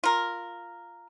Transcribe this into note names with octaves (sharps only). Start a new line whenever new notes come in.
F4 A#4